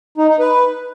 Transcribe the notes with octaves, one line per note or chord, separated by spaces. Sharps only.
D#4
D#4
B4